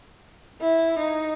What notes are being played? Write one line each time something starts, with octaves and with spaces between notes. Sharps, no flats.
E4
D#4